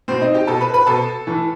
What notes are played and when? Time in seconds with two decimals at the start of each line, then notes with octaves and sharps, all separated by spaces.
0.08 B2 C4 C5
0.21 D#4 D#5
0.34 G4 G5
0.47 B2 A4 A5
0.61 B4 B5
0.74 B4 B5
0.87 B2 A4 A5
1.27 A2 E3